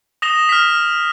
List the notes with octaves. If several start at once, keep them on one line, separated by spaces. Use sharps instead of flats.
D#6 A#6 E7 G7
F6 B6